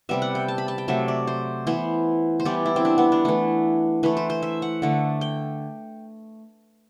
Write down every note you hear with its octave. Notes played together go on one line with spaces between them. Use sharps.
C3 G3 B3 E5
F#5
G5
A5
B5
A5
G5
C3 F#3 A3 E5
D5
C5
E3 B3 C5
C5
E3 G3 B3 D5
E4
C4
D4
B3
D4
E3 A3
E3 A3 B4
C5
C5
E5
F#5
D3 A3
G5